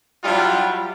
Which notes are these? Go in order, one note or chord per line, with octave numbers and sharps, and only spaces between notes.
F#3 G3 D4 E4 F4